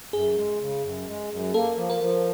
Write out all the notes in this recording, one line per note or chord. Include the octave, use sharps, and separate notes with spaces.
F#2 G#4
G#3
C#3
F#2
G#3
F#2
A#3 A4
F3
A#4
F3